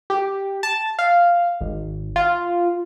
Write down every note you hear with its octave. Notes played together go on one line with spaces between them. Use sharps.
G4
A5
F5
G#1
F4